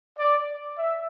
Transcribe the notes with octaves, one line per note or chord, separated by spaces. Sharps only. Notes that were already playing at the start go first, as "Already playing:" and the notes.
D5
E5